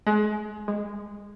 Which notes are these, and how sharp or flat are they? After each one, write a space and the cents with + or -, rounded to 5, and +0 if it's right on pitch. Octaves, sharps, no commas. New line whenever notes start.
G#3 +30
G#3 -15